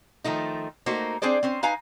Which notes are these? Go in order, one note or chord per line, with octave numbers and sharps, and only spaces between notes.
D#3 F3 A3 D#4
A3 A#3 D#4 F#4 C5
C4 D4 G#4 C5 D5
C4 C#4 C5
D#4 B4 F5 G#5 A#5